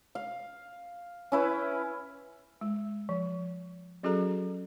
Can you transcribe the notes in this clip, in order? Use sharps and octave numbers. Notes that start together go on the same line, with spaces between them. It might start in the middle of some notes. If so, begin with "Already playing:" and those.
F5
C#4 E4 B4
G#3
F3
F#3 C#4 F#4 G#4 A4 A#5